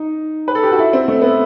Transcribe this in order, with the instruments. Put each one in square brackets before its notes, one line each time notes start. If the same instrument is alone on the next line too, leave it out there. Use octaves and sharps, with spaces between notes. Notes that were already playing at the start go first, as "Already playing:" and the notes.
Already playing: [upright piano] D#4
B4
A4
G4
F#4
E4
C4
A3
B3